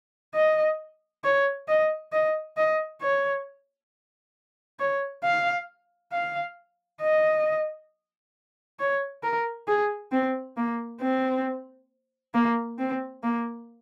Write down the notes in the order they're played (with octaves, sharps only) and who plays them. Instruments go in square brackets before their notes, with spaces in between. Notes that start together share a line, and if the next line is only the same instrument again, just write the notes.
[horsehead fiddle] D#5
C#5
D#5
D#5
D#5
C#5
C#5
F5
F5
D#5
C#5
A#4
G#4
C4
A#3
C4
A#3
C4
A#3